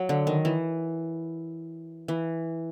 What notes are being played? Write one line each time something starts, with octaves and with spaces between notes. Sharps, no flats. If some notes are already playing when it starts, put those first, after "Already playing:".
Already playing: F#3
D3
D#3
E3
E3